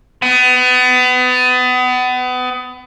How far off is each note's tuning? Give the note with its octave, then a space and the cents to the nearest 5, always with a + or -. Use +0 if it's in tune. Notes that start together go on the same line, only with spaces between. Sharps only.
B3 +30